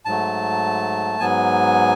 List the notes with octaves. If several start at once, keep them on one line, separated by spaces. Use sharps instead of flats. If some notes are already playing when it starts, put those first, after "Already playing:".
G#2 F#3 A3 A5
G#2 F#3 B3 G#5